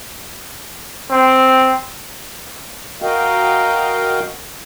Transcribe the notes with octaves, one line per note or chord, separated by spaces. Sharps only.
C4
F#4 A#4 D#5 F5 G5